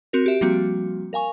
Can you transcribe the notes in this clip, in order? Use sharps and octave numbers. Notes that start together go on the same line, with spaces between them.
C4 F#4 A#4
G4 E5
F3 G3 A#3 C4 F#4
A#4 F5 G#5 C#6